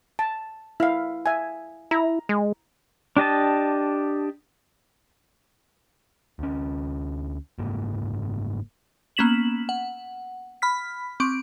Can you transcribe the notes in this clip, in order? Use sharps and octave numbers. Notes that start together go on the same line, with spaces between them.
A5
E4 F5
E5 G#5
E4 A#5
G#3
D4 G4 D#5 A5
D2 C#4
F#1 G#2 A#3
A#3 B3 C#4 B6 E7 F#7
F#5
B5 F6 B6
C4 C#6 D6 D7